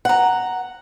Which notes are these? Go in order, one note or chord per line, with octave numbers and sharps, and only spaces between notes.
F#5 A#5